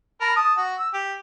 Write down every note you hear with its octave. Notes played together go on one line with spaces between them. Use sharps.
A#4 A5 B5
A5 D#6
F#4
E6
G4